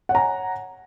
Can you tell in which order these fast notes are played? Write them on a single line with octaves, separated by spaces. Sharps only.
F#5 C#5 A#5 G#5